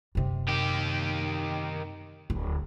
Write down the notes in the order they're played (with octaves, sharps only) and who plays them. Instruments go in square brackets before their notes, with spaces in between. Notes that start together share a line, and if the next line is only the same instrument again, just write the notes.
[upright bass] F#2 C3
[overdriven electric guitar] D#3 G4
[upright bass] D1